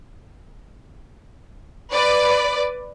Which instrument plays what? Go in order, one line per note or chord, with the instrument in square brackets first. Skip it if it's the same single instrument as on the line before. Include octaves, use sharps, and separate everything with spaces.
[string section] B4 D5